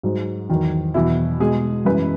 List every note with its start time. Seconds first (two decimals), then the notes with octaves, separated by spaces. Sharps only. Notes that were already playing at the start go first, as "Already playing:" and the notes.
0.03 G#2 F#3
0.49 E2 D#3 F#3
0.94 E2 B2 F#3 E4
1.40 B2 G#3 G#4
1.85 F#2 E3 G#3 B4